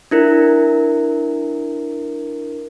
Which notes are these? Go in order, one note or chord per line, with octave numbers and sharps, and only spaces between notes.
D4 E4 A#4